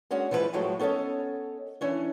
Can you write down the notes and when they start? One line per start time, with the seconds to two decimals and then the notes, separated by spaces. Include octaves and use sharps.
0.11 G#3 C#4 D4 F#4
0.31 E3 F3 G#3 G#4 B4
0.53 A2 F3 F#3 G#3 A3
0.79 B3 C#4 A4 C#5 D#5
1.81 E3 C#4 D4